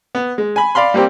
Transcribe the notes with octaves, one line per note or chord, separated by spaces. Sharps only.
B3
G#3
G#5 B5
D5 F5 B5 C6
G3 A#3 C4 G4